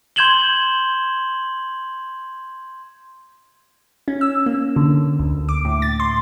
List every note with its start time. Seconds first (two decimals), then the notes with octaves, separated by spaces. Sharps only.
0.16 C6 G6 G#6 E7 F#7 G7
4.08 C#4
4.21 E6
4.46 A#3
4.76 D3
5.19 D2
5.49 D6
5.65 A2
5.82 A6
6.00 C6